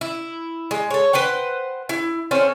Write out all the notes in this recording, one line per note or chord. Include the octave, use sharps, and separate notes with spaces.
E4
G#3
A4 C#5
B4 C5 F#5 G5
E4
C4 C#4 A4 F5